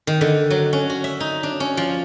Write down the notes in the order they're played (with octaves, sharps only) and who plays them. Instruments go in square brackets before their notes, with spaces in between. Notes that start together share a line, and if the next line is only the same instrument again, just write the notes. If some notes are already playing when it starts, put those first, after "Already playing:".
[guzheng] D#3
D3
F#3
C#4
F#4
E5
D#4
D4
C#4
F3